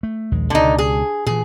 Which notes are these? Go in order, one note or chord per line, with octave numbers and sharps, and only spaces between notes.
A3
A#1 D#2 G#3
C#2 B2 D3 D#4
G#4
A#2 E3 G#4